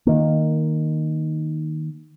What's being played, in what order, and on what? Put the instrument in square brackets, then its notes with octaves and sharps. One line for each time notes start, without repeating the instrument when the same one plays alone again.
[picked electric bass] D#3 A#3